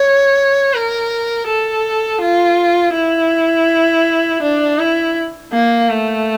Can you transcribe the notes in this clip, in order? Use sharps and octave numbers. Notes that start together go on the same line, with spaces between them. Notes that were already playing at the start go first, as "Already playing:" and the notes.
Already playing: C#5
A#4
A4
F4
E4
D4
E4
A#3
A3